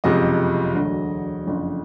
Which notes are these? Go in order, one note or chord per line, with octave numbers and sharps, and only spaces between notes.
F#1 F2 C3 F3 G#3 D#5
E1 D2 D3 F#3
F#1 F2 D3